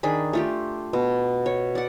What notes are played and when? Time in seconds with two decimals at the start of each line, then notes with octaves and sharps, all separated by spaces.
0.03 D#3 D4 G#4 B5
0.33 A3 F4 G4
0.93 B2
1.46 C#5
1.75 D5 F#5